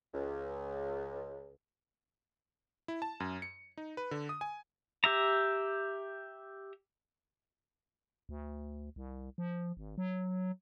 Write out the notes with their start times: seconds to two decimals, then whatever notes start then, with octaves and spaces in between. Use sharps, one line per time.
0.13 C#2
2.88 E4
3.02 A5
3.20 F#2
3.42 C#7
3.77 D#4
3.97 B4
4.11 D3
4.29 D#6
4.41 G#5
5.04 G4 E5 A#5
8.29 D2
8.96 C2
9.38 F3
9.77 G#1
9.98 F#3